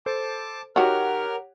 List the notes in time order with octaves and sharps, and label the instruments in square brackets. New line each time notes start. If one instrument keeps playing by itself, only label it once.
[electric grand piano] A4 C5 [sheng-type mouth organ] A5 D6
[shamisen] D#3 F#4 [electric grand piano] G4 C#5 F#5 [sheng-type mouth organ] A#4 F6